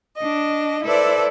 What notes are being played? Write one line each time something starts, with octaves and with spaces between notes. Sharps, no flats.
D4 D#5
E4 A4 B4 C5 D5